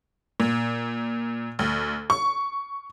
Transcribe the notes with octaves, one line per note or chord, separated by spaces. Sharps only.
A#2
D2
C#6